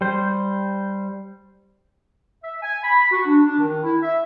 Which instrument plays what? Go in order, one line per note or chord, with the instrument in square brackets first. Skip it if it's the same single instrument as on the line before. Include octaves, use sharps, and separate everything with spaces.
[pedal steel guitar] G3 C5
[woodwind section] E5
G#5
B5
F#4
D4
D4
D#3
E4
E5